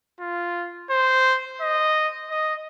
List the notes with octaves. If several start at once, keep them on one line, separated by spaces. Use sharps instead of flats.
F4
C5
D#5
D#5